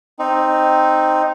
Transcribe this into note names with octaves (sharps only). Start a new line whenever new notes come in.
C4 D#4